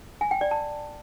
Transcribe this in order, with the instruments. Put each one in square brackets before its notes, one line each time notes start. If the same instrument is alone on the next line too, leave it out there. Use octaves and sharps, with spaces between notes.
[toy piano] G#5
G5
D5
A5